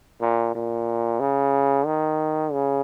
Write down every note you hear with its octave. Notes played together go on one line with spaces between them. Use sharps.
A#2
A#2
C#3
D#3
C#3